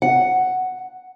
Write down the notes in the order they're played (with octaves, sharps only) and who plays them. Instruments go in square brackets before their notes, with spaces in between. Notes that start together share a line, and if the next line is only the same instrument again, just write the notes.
[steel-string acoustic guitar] F#5